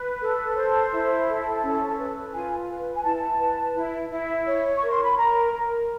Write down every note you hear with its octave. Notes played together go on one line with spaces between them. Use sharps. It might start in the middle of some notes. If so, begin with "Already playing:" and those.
Already playing: B4
A4
C5
E4
A4
C#4
B4
F4 G#5
B4
G#5
E4 A5
B4
E4
E4
C#5
C#6
A#4
C6
B5
A#4 A#5
A#4